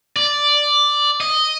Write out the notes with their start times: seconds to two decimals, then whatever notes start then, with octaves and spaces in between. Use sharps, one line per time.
0.16 D5
1.21 D#5